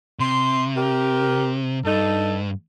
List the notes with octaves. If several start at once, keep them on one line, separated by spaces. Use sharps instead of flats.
C3 C6
G4 A#4
G2 D#4 A4